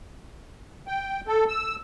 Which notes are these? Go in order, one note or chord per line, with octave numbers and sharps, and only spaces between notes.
G5
A4
E6